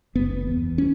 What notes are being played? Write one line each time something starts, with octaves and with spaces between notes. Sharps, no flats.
F#1 B3
E2
C#4